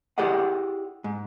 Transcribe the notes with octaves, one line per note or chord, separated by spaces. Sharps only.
E4 G4 G#4 D5 D#5 F#5
G#2